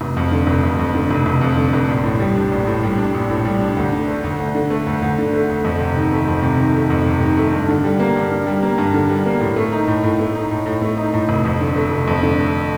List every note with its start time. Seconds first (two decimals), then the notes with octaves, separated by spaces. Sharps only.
0.01 F1
0.17 F2
0.32 D3
0.47 F1
0.63 F1
0.79 F2
0.95 D3
1.11 F1
1.26 F1
1.41 F2
1.57 D3
1.73 F1
1.88 A#1
2.04 A2
2.20 G3
2.35 D4
2.52 A#1
2.67 A2
2.83 G3
2.98 D4
3.14 A#1
3.30 A2
3.45 G3
3.61 D4
3.77 D2
3.92 D3
4.08 A3
4.24 D2
4.40 D2
4.55 D3
4.70 A3
4.87 D2
5.02 D2
5.18 D3
5.33 A3
5.50 D2
5.64 F2
5.80 C3
5.96 D#3
6.12 A3
6.28 F2
6.43 C3
6.59 D#3
6.75 A3
6.90 F2
7.06 C3
7.21 D#3
7.37 A3
7.53 G2
7.69 D3
7.84 G3
8.00 A#3
8.16 G2
8.31 D3
8.47 G3
8.62 A#3
8.78 G2
8.94 D3
9.09 G3
9.26 A#3
9.41 A2
9.56 A3
9.72 D#4
9.88 A2
10.03 A2
10.19 A3
10.35 D#4
10.51 A2
10.66 A2
10.82 A3
10.98 D#4
11.14 A2
11.29 F1
11.45 F2
11.60 D3
11.76 A3
11.91 F1
12.07 F2
12.23 D3
12.38 A3